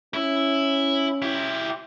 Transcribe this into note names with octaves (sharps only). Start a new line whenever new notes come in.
C#4 E4
E4 G4